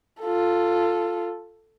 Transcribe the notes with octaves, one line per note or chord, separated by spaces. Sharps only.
F4 A4